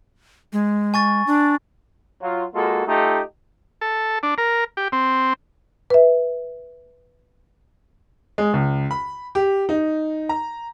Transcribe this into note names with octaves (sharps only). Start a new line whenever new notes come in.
G#3
G#5 C#6 A6
D4
F#3 F4
G#3 A#3 F4 F#4 A4
A3 D#4 F4 G4 A4
A4
D4
A#4
G4
C4
B4 E5
G#3
C#2
B5
G4
D#4
A#5